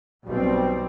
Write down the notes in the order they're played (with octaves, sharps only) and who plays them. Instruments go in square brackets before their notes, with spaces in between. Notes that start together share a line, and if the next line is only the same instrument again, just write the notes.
[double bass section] B1 G3 C4